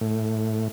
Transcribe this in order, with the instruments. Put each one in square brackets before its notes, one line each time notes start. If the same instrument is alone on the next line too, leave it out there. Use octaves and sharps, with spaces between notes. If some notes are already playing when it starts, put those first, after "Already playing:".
[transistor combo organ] A2